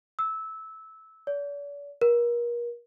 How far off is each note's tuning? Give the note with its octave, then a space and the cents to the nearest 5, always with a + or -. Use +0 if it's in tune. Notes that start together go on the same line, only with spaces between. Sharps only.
E6 -15
D5 -45
A#4 +35